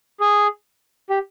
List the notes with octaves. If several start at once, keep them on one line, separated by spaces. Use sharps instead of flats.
G#4
G4